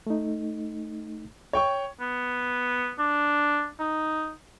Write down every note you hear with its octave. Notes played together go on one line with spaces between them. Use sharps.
A3 D#4
C#5 G5 C#6
B3
D4
D#4